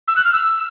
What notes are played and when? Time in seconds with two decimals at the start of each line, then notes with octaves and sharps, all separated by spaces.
0.08 E6
0.16 F#6
0.25 F6
0.33 E6